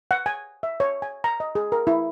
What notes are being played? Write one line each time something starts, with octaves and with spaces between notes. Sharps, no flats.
F#5
G#5
E5
C#5
G#5
A#5
D#5
G#4
A#4
E4